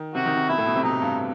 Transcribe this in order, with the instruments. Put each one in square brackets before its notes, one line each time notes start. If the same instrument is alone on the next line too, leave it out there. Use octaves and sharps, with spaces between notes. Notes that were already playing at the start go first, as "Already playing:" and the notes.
Already playing: [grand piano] D#3
[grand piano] C3 [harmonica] F#4
[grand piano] D#3
C3
[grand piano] B2 [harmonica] E4
[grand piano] A2
B2
C3
[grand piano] B2 [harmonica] D#4
[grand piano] A2
G2